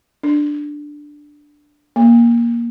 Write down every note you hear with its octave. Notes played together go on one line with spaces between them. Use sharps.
D4
A#3